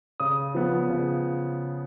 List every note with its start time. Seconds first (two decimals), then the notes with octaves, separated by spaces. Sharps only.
0.20 C#3 D#6
0.55 F3 B3
0.89 C#3